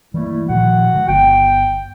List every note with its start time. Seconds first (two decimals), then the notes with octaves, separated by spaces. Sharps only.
0.14 E3 G3 A3 A#3 E4
0.49 A#2 D#3 F3 F#4 F#5
0.93 D3 E3 G#3
1.08 G1 B3 G5